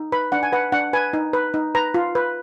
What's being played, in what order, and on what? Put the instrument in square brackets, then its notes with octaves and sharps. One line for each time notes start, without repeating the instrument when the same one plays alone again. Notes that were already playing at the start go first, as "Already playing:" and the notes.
Already playing: [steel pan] D#4
B4 B5
D4 F#5
G#5
B4 F#5
D4 F#5
B4 G#5
D#4
B4
D#4
B4 A#5
F4
B4